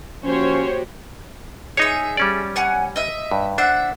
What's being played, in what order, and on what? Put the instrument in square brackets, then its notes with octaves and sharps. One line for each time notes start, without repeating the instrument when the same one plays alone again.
[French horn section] F3 C#4 [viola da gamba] A#3 F#4 G4 [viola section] C5 C#5
[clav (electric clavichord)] D#4 C#5 [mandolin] G#4 E5
[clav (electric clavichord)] G3 C#4 D5
[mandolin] C#5 F#5 G#5
D#5 E5
[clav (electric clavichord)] G2
[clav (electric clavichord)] D4 C5 [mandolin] E5 F#5